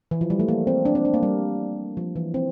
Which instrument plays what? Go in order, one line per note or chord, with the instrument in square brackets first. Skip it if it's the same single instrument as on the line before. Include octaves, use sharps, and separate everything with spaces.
[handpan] E3
F3
G3
A3
A#3
C4
D4
C4
D4
A#3
G3
F3
E3
C4